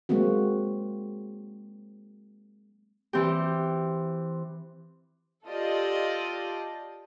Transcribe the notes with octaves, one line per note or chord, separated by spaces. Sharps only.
F#3 G#3 A#3 C4 F#4
E3 C4 G4
F4 G4 A4 D5 D#5